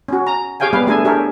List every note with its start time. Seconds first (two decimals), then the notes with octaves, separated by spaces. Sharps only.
0.08 C#4 F#4
0.27 A#5
0.60 G4 G#4 C#5 F5 G5 G#5
0.73 G3 B3 B4 F5
0.87 A3 D4 G#4 A4 G#5
1.04 D4 G4 G#4 A#4 C#5 E5